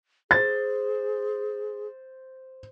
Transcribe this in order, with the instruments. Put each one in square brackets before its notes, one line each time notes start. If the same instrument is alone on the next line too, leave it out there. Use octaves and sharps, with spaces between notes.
[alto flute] G#4 [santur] C5 [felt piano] A6